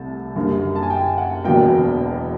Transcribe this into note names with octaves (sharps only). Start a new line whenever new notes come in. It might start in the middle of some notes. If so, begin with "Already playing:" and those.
Already playing: C2 C3 A3 A5
F#1 F#2 D3 G3 A#3
A5
G#5
G5
F#5
E1 E2 B2 F#3 A#3 G5